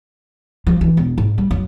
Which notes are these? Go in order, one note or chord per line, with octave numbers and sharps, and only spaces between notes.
F3
E3
E1
G#2
G3
F#2